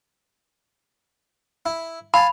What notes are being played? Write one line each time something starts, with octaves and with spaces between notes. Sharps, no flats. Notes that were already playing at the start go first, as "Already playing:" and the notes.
E4
F5 G#5 A5 B5